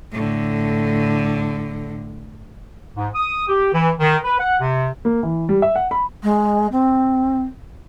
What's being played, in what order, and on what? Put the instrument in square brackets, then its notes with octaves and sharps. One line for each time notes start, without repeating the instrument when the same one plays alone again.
[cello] A2 D3
[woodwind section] G#2
D#6
G4
E3
D#3
B4
F#5
C3
[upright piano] A#3
E3
G3
E5
F#5
B5
[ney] G#3
C4